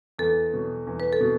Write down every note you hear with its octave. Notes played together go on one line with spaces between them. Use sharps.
E2 A4
B2 F#3
E2
B4
A4
B2